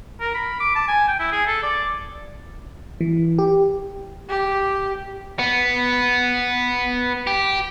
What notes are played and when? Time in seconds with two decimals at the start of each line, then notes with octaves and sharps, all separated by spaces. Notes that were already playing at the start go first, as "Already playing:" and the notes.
0.20 A#4
0.34 B5
0.60 D6
0.75 A5
0.88 G#5
1.08 G5
1.20 E4
1.32 G#4
1.47 A4
1.63 D5
3.01 E3
3.39 G4
4.29 G4
5.39 B3
7.27 G4